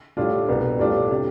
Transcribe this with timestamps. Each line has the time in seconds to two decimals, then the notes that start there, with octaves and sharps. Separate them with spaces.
0.17 A2 G3 D4 F4
0.49 C2 B2 B3
0.79 A2 G3 D4 F4
1.11 C3